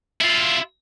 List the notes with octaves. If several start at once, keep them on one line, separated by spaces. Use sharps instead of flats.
E4 F4